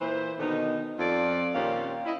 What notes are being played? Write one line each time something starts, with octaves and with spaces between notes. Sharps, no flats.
A#2 E3 E4 C5
B2 D3 D#3 B3 D#4
F2 F4 D5
D#2 A#2 C4 C#4 G4 F5
E4 D#5